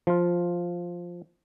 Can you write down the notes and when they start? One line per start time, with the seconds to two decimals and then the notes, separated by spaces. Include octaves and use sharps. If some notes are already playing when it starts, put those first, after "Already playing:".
0.07 F3 F4